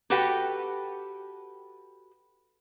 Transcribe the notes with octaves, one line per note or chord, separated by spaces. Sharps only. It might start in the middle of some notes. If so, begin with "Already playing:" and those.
F#4 G4 A4 B4 F#5 G5